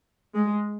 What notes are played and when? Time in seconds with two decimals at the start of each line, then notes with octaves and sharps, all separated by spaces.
0.34 G#3